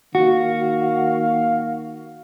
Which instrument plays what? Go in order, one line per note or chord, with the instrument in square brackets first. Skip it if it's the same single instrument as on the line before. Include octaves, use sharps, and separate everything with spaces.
[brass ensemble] D#3 A#3 F5 [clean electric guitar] F#4